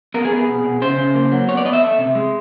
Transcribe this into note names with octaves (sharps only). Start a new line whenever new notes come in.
B3 A#4
G#4
B3
G#4
B2
B2
C#3 C5
C#3
A#3
F#3
B3 C#5
D5
B3 D#5
E5
A3
C3
G#3